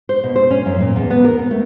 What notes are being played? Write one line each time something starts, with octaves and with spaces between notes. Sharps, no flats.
C5
B2
C5
C#4
F#2
A#2
E2
B3
A#4
C4
A3